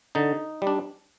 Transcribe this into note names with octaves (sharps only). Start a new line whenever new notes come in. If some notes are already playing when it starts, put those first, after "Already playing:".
D3 D#4
G3 D4